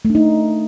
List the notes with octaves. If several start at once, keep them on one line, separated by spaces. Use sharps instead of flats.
A3
D4
D#4